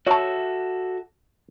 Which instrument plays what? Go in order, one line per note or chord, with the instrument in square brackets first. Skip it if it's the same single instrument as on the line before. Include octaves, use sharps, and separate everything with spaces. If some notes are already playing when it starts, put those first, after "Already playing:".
[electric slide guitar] F#4 A4 E5 [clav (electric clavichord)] C#5 A5